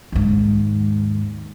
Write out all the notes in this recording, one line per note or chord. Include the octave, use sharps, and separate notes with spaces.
D#2 G#2